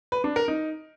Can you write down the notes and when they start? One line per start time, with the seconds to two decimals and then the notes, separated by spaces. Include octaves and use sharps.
0.12 B4
0.24 D4
0.36 A#4
0.48 D#4